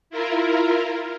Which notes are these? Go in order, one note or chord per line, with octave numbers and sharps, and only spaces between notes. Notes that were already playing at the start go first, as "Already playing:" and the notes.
E4 F4 A#4